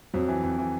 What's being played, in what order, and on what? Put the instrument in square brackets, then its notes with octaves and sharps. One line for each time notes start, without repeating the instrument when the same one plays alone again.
[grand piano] F2 F#3
E3
F2
E3